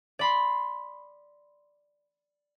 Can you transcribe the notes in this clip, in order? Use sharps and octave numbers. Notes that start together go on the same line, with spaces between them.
D5 B5 C6